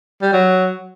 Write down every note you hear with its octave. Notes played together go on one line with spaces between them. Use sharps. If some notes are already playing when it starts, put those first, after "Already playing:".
G3
F#3